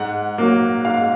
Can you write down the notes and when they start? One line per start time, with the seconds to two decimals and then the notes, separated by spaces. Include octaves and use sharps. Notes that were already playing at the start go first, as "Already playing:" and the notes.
Already playing: G#2 F#5
0.38 F#3 A#3
0.85 G#2 F5